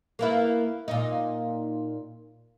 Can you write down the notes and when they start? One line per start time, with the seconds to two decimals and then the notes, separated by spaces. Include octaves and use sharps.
0.19 A#3 B3 E4
0.88 A#2 D#4